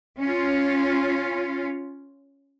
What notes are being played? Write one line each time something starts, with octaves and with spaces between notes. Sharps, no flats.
C#4 F4